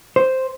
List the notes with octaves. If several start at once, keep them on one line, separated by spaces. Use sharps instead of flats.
C5